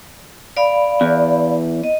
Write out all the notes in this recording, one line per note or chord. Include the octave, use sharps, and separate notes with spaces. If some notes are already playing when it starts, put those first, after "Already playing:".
D5 F5 B5
E2
D#5